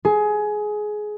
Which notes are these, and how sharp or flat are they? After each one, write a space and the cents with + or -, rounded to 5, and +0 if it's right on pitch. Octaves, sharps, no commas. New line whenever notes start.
G#4 +20